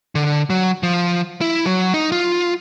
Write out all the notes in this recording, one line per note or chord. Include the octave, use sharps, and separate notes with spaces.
D3
F#3
F3
E4
F#3
D#4
F4